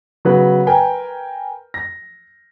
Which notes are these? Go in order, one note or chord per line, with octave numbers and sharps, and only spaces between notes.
C#3 F#3 B3 B4
A#4 B4 G5 G#5
A#6